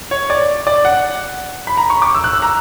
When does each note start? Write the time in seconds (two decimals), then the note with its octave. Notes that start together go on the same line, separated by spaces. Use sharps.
0.11 C#5
0.30 D5
0.67 D5
0.85 F#5
1.67 B5
1.77 A#5
1.90 C#6
2.02 D6
2.15 E6
2.24 F#6
2.33 E6
2.42 A#5